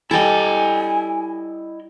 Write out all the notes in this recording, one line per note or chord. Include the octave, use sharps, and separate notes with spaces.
G3 E4 A4 D#5 G#5